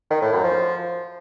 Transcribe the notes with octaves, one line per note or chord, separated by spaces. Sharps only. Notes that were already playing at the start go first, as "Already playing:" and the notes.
D#3
A2
F#2
F3